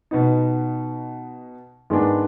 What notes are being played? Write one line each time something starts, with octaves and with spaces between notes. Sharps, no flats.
B2 B3 D#4
G#2 D#3 G#3 B3 D4